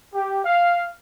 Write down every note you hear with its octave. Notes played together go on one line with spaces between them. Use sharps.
G4
F5